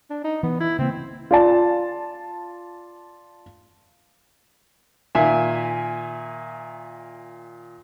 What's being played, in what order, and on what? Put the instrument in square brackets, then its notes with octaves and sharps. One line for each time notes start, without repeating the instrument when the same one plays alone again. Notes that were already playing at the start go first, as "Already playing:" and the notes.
[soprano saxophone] D4
D#4
[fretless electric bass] E3 [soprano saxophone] B3
[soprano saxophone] E4
[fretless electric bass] C#3 A#3 [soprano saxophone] C4
[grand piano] F4 D5 A5
[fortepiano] A#2 D#3 E5 G#5